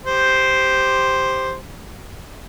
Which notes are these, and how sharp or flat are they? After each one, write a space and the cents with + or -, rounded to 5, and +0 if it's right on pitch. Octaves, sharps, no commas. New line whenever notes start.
G4 +0 C5 +0